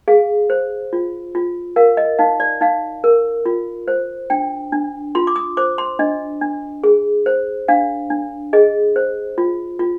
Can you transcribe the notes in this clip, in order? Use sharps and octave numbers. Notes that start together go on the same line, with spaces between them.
G#4 F5
C5
F4
F4
A#4 F5
D#5
D#4 F5
D5
D#4 F5
A#4
F4
C5
D4 G5
D4
F4 C6
D6
D#6
C5 D6
C6
D4 D#5
D4
G#4
C5
D4 F5
D4
G#4 D#5
C5
F4
F4